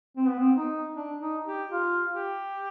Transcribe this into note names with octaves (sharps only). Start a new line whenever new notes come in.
C4
B3
C4
D#4
D4
D#4
G4
F4
G4